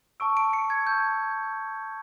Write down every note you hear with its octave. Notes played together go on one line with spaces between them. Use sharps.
A5 C#6 E6 D7
D7
C#7
G#6
A5 C#6 E6 G6